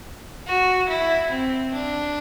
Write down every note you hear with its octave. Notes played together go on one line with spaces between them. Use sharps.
F#4
E4
C4
D4